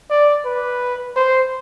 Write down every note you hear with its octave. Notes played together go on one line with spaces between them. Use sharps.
D5
B4
C5